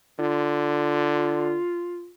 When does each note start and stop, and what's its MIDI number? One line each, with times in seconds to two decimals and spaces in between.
0.19 1.58 50
0.19 2.11 65